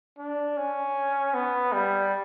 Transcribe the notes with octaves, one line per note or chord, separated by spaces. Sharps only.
D4
C#4
B3
G3